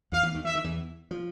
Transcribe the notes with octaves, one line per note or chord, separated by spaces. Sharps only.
E2 E3 F5
E2 E3
D#2 D#3
E3 E5
D#3
E2 E3
F3